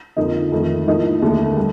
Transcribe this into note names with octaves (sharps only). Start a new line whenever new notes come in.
F2 D3 F3 A#3 D#4
F2 D#3 A3
A2 F3 A#3 D#4
D#2 D3 A3
G3